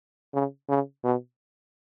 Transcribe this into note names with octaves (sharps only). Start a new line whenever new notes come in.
C#3
C#3
B2